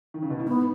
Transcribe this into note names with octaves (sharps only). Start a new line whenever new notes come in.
D#3
C#3
B2
A2
G#2 B3